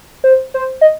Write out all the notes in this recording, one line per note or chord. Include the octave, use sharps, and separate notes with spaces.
C5
C5
D#5